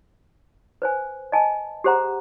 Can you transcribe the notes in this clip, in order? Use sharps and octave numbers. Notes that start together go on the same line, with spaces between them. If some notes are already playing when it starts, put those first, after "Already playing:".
B4 C5 G#5
D#5 G#5 A5
G4 G#4 C5 F#5 A#5